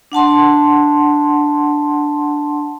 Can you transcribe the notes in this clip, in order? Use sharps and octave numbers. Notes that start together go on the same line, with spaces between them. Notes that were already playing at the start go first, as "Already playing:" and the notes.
D4 F#5 A5 C6